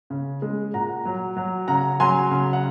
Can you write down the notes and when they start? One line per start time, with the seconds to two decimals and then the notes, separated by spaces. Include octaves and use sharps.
0.10 C#3
0.42 G#3
0.74 A#2 F#5 A#5
1.05 F#3
1.37 F#3
1.68 C#3 F#5 A#5
2.00 F#3 G#5 C6
2.31 C#3
2.53 F#5